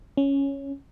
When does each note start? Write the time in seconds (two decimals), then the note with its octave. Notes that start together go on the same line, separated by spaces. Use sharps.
0.17 C#4